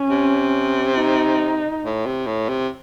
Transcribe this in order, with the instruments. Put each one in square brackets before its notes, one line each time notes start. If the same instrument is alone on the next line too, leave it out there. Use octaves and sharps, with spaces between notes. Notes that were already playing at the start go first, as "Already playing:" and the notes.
Already playing: [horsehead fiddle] C#4
[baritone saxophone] C3
[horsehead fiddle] D#4
[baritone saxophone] A2
C3
A2
C3